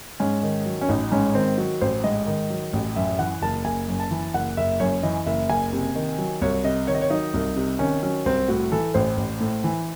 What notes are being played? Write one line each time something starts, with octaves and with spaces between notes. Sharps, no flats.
G#2 C#4
D#3
F#3
C#4
A1 D#4
G#2 C#4
D#3 C4
F#3 F#4
A1 C5
G#2 D#5
D#3
F#3
A1
F#2 E5
E3 F#5
F#1 A5
F#1 G#5
F#2
A5
E3
F#1 F#5
F#1 E5
F#2 C#5
E3 D#5
F#1 E5
F#1 G#5
C3
D#3
F#3
C2 C#5
C3 D#5
D#3 C#5
D#5
C#5
F#3 D#4
C2
C3
D#3 C#4
F#3 C#4
C2 C4
A2 F#4
E3 A4
A1 C5
A1
A2
E3